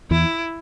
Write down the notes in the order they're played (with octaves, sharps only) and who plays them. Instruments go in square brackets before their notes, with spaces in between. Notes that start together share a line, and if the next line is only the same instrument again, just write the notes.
[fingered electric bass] E2 E3 [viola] E4